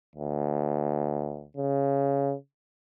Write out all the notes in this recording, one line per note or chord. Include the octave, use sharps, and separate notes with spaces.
D2
C#3